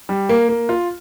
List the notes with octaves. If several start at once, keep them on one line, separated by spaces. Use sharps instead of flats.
G3
A#3
A#3
F4